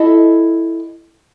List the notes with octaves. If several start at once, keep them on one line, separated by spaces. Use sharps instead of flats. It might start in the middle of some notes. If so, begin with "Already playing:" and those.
Already playing: E4 A4 D#5